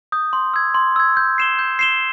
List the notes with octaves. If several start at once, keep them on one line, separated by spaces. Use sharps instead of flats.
D#6 G6
C6
E6 G#6
C6
E6 G#6
G6
C7 E7 G7
G6
C7 E7 G7